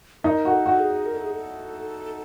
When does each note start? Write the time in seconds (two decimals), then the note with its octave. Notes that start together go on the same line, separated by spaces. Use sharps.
0.24 D#4 A#4
0.45 F#4
0.52 A4
0.66 F#4
0.79 G#4
1.06 A#4
1.15 A4
1.24 G#4
1.33 A4